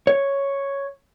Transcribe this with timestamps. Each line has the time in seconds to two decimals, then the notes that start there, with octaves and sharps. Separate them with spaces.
0.07 C#5